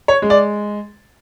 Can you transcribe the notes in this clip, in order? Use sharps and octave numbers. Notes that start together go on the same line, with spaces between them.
C#5
G#3
D5